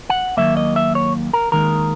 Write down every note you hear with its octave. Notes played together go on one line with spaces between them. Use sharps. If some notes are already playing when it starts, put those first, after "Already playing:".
F#5
D#2 D#3 F#3 A#3 E5
D#5
E5
C#5
A#4
D#2 D#3 G#3 A#4